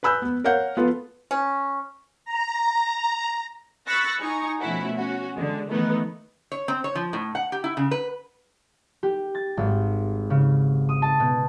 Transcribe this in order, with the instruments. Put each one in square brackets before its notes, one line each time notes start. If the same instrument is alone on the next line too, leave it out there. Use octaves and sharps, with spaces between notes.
[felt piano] B4 G#5 B5 E6 F#6 G6
B3
A#4 C#5 F5 F#5 G6
B3 F4 A4 B4
[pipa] C#4
[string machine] A#5
[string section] B5 C#6 E6 F#6 A6 A#6
D#4 G#5 A#5 C#6
B2 F3 A3 C#4 E4 F#4
C#4 F#4
D3 G#3
D#3 E3 A3 B3 D#4
[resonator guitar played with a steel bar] C#5
C4
C#5
F3
A2
F#5
G4
E4
C#3
B4
[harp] G4
A6
G#1
C#3
D#6
A5
B2